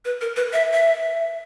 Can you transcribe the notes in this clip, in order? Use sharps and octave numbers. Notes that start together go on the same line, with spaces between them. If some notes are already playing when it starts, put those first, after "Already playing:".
B4
A#4
B4
E5
E5